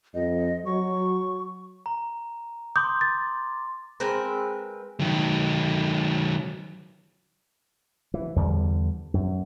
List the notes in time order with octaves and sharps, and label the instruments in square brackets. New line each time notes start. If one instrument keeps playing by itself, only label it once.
[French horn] F2 [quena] D#5
[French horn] F#3 [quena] C#6
[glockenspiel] A#5
[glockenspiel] C6 D6 [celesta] D#6 G6
[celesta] A6
[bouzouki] G#3 C4 A#4 B4
[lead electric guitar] D#3 F#3
[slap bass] E3
E2 D3 G3
F#2